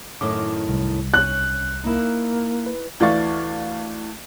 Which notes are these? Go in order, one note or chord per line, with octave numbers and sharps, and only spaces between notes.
F#2 A2 D#3 D6
C2
C#4 F#6
A#3 D#4 E4
B4
D2 E3 D5 F5 C#6 A6